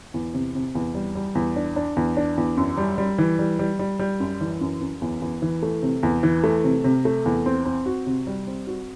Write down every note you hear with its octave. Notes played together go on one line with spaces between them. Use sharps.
E2
C3
C3
E2
G3
G3
E2
D4
D4
E2
D4
E2
F#2
G3
G3
E3
G3
G3
G3
G3
F#2
E3
F#2
F#2
E2
E2
E3
A3
C3
E2
E3
A3
C3
C3
A3
E2
C4
C4
F#4
C3
G3
C4
F#4